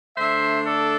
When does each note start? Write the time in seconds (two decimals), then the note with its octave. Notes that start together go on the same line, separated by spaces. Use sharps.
0.16 D3 A3 D4 C5 E5
0.66 A4 D5